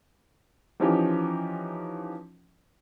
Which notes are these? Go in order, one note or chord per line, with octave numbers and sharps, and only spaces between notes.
E3 F3 C#4 D#4 F4 G4